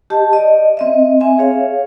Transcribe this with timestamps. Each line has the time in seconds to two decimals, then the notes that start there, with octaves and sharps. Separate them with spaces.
0.10 G4 D#5 A5
0.33 D5 D#5
0.77 C4 D#5 E5
1.21 C4 E5 G#5
1.38 G#4 C#5 F5